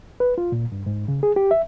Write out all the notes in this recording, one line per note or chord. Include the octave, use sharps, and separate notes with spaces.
B4
F4
A#2
G2
G#2
C#3
G#4
G4
E5